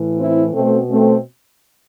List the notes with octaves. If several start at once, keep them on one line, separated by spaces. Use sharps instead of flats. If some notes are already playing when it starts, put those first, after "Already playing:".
Already playing: A2 E3
C4 E4
B2 A3 C4
A3 C4